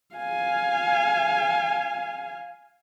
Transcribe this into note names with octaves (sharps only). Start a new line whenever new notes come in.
F5 G#5